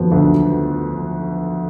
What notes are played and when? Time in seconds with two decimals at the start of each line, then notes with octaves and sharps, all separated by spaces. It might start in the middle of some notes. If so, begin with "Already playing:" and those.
Already playing: F2 D#3 F3 F#3 B3
0.12 D2 D3